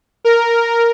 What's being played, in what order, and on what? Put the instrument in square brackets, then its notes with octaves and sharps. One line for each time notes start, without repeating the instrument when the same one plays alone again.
[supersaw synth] A#4